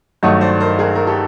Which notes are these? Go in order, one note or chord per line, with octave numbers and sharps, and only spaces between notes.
G2 D#3 F#3 A3 C#5 D#5
C5 D5
A#4 C5
G#4 A#4
A#4
G4 A4